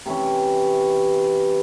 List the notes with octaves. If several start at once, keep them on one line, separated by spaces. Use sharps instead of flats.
C3 E3 C#4